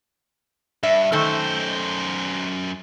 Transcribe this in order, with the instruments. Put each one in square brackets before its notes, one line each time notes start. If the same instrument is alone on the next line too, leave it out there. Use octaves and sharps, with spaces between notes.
[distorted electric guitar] G2 [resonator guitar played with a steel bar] E5
[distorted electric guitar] F#2 C5 [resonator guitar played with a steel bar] D#3 A3 A4